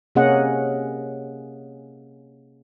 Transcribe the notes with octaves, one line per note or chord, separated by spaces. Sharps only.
C3 A#3 C#4 G#4 D#5 F#5